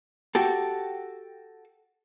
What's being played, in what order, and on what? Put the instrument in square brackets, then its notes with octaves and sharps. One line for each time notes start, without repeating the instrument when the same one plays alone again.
[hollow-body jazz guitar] F#4 G4 A4